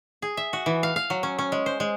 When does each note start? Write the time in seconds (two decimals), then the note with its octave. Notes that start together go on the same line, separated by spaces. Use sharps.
0.22 G#4
0.37 E5
0.53 F#4
0.66 E3
0.83 F5
0.96 F5
1.10 F#3
1.23 C#4
1.39 C#4
1.52 G#3
1.66 C5
1.80 G#3